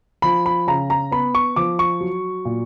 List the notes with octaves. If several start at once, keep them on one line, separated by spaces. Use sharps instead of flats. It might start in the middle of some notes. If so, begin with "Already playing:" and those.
F3 B5
B5
C#3 A#5
A#5
B3 B5
C#6
F3 D6
C#6
F#3
A#2